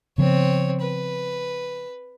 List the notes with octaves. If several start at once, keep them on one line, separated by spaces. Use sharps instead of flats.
C#3 F3 B3 C4 C#5
B4